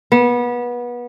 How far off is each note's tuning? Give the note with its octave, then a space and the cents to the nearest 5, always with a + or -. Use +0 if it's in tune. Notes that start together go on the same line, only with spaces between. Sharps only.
B3 -25